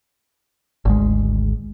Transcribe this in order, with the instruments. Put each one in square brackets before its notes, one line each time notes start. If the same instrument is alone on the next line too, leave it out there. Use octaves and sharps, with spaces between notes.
[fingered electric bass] G#1 D2 G#3